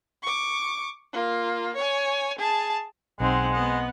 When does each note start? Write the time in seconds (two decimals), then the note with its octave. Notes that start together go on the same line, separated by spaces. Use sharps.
0.22 C#6 D6
1.13 A#3 F4
1.76 C#5 G#5
2.39 G#4 A5
3.20 B1 G#3 C4 D#4 F#5
3.53 B3 D#5 F#5